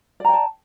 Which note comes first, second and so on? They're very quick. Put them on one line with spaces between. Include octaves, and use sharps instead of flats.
D5 A#5 G5 A5